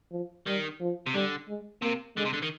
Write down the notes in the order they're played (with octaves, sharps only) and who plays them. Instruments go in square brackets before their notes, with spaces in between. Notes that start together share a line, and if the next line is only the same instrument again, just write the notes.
[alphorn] F3
[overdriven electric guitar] D#3 [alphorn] G3
[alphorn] F3
[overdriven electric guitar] C3
[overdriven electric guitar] D3 [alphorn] G3
[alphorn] G#3
[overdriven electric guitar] C3 [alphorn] A#3
[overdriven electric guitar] D3 [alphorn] G#3
[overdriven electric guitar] C3
D3
D#3